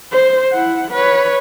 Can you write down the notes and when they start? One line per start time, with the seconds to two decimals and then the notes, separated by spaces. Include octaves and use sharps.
0.12 C5
0.52 E4 F#5
0.91 B4 C#5